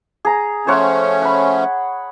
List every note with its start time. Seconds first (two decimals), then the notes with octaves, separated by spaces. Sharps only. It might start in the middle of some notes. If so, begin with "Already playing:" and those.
0.25 G#4 A#5
0.67 F3 A3 C#4 C5 C#5 F#5
1.22 F#5 B5